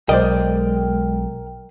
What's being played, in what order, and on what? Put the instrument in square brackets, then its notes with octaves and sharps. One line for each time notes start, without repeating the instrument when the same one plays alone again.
[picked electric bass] B1 [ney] G#3 [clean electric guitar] A#4 G5 [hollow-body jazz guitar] C5 D5 D#5